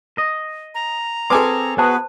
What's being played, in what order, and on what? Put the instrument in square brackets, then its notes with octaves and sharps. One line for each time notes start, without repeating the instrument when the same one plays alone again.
[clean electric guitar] D#5
[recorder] A#5
[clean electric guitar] C4 G#4 [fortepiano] A4 G#5 D6 [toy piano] B4 C6
[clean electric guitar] B3 F#4 G#4 [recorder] B4 [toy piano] C5 A5